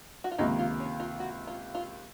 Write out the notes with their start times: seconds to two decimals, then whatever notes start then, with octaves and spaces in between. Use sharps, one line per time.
0.24 F#4
0.32 F4
0.38 C#2 C3 D#3 A#3 D#4
0.59 F4
0.80 C#4
1.00 F4
1.20 F#4
1.47 F4
1.75 F4